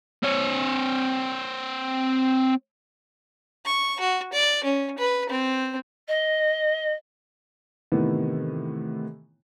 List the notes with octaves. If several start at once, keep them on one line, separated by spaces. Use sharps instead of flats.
C4 C#5
C#6
F#4
D5
C#4
B4
C4
D#5
A2 C3 D#3 E3 B3 E4